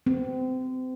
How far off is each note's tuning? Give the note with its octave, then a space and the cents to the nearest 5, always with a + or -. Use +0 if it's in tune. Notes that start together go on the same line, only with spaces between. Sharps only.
C4 -30